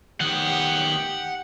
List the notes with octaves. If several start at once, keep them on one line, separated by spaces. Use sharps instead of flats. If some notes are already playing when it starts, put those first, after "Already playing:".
D#3 B3 G4 F#5